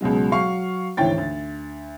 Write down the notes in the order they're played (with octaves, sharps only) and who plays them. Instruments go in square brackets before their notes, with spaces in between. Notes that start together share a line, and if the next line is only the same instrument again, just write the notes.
[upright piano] C#2 B2 F#3 G#3
F#3 F5 C#6 C7
G#1 D2 E3 C#5 G5 A6
D2